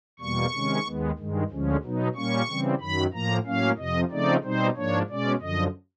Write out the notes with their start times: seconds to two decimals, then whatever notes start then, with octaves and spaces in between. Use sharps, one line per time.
0.19 E2 B2 G3 A#3 C#6
0.52 C3 D#3 G#3 C#4
0.85 D#2 D#3 G#3 B3
1.18 G2 D#3 G#3
1.50 D2 D3 F3 G#3 C#4
1.83 B2 F#3 B3 D#4
2.15 A#2 G3 A#3 C#4 C#6
2.48 C#3 E3 G3 C4
2.81 F#2 D#3 F#3 B5
3.13 A2 F3 A#3 A#5
3.45 A2 F#3 A#3 C#4 F5
3.78 F2 C3 F3 D#5
4.11 C#3 F3 A3 C4 D#4 D5
4.44 B2 G3 C4 D#4 C5
4.76 G#2 F3 A#3 D4 C#5
5.09 B2 G#3 C#4 D5
5.41 F#2 D3 F3 D#5